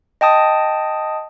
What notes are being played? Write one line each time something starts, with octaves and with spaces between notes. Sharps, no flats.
D#5 G5 A5 D#6